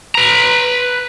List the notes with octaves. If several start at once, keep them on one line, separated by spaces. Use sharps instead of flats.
B4 A#5